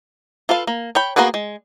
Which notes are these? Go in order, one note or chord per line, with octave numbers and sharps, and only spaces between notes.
F4 A4 B4 F5
A#3
C#5 G5 B5
A#3 B3 F#4 G#4 B4
G#3